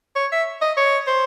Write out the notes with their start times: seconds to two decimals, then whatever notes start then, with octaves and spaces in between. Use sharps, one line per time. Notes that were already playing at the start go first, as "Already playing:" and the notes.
0.16 C#5
0.32 E5
0.61 D#5
0.77 C#5
1.07 C5